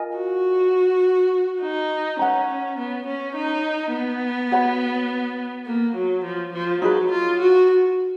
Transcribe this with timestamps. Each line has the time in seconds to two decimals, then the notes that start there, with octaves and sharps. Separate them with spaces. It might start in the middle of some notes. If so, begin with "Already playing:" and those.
Already playing: F4 A#4 D#5 G#5
0.17 F#4
1.62 D#4
2.19 C#4 B4 F#5 A#5
2.78 B3
3.07 C#4
3.35 D#4
3.93 B3
4.51 F#4 C#5 F#5 B5
5.66 A#3
5.95 F#3
6.24 F3
6.53 F3
6.81 F#3 D#4 G#4 B4
7.11 F4
7.39 F#4